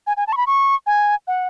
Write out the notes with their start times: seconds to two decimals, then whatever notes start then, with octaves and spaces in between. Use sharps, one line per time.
0.07 G#5
0.17 G#5
0.27 A5
0.33 C#6
0.37 B5
0.47 C#6
0.87 G#5
1.27 F#5